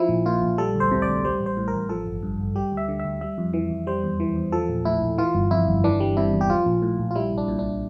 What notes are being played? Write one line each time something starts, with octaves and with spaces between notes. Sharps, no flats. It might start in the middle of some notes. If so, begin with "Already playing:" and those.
Already playing: F3 E4
A#1
A#2 F4
A#1
G3 A4
D2
C5
C3
D5
D2
G3 C5
A1
C5
A2
A#4
A1
F3 A4
G1
G2
G1
G3 G4
D2
E5
D3
E5
D2
G3 E5
F2
E3
F2
G3 C5
E2
E3
E2
F3 A4
A#1
A2 E4
A#1
E3 F4
G1
F2 E4
G1
E3 D4
G3
C3 E4
E2
G4
F3 F4
A#1
A2
A#1
F4
G3 E4
C2
D4
A#2
D4